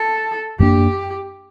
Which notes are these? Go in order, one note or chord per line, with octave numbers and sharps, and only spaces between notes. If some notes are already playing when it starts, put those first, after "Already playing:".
Already playing: A4
F#2 F#3 A#3 D4 G4